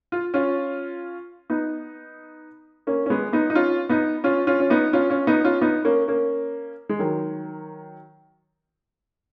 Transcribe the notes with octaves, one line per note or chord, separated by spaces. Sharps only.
F4
C#4 F4
B3 D#4
A#3 C#4
C#4
G#3 B3
B3 D#4
D#4
C#4 F4
B3 D#4
C#4 F4
C#4 F4
C#4
B3 D#4
C#4 F4
C#4 F4
B3 D#4
C#4 F4
B3 D#4
A#3 C#4
A#3 C#4
G#3
D#3 F#3